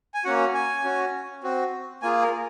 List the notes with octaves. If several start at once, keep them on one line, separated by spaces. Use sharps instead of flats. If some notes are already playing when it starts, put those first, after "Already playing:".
G#5
A#3 C#4 F#4 F#5
G#5
C#4 F#4
C4 F#4
A#3 F4 G#4 G#5
A#4